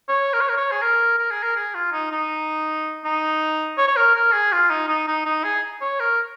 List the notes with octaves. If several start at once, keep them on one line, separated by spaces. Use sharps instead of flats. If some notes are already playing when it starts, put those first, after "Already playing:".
C#5
A#4
C#5
A#4
C#5
G#4
A#4
A#4
G#4
A#4
G#4
F4
D#4
D#4
D#4
C#5
C#5
A#4
A#4
G#4
F4
D#4
D#4
D#4
D#4
G#4
C#5
A#4